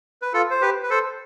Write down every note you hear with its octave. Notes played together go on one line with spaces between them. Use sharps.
B4
F4 A4
C5
G4 B4
B4
A4 C5